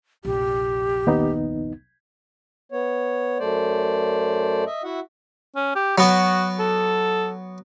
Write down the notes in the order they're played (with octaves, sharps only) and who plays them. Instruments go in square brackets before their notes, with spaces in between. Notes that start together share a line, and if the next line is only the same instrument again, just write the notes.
[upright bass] F1 A#1 [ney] G4
[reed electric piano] D#2 B3 D#4
[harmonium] B3 C#5
F#2 A3 C5 D5
D#5 E5
E4 F#4 E5 F#5
[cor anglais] C#4
G4
[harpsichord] F#3 B3 [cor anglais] F#4
[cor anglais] A4